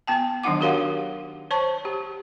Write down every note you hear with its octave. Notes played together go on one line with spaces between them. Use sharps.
B3 G5 A5
D#3 F#3 D4 D#4 F#5 D6
F#4 G4 A#4 C#5 F5 F#5
C5 C#5 A5 C#6
G4